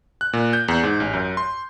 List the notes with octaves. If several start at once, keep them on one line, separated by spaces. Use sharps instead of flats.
F#6
A#2
G6
E2
G#2
A1
F#2
C6